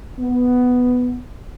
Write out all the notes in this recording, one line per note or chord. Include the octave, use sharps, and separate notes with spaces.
B3